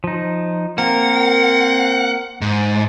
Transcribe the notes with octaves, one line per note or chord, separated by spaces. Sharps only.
F3 D#4
A#3 C4 A#4 F#5
G#2